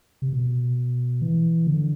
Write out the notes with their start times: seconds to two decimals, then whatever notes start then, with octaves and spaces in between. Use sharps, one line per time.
0.22 C3
0.33 B2
1.22 E3
1.67 D3